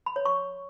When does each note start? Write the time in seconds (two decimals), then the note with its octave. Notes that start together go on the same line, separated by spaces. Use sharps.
0.06 B5
0.16 C#5
0.25 C#6